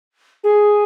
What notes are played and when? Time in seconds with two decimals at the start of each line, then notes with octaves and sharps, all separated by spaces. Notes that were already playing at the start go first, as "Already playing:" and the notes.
0.44 G#4